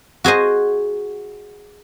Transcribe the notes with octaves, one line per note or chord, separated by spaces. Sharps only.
F#4 G#4 C5 D#5